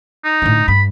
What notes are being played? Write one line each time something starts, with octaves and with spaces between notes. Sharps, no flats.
D#4
A2 D3
G2 B5